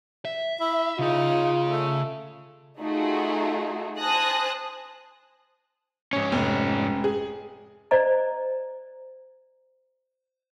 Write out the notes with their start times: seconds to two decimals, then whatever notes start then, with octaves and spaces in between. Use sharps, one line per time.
0.25 E5
0.61 E4
0.99 C#3 D#4 F4 G#4
1.69 A3
2.79 A3 D#4 F4 F#4 G#4
3.99 C5 G#5 A5 D#6 F#6 A#6
6.13 G#2 C#4
6.32 F1
7.04 G#4
7.91 C5 D5 D#5 A#5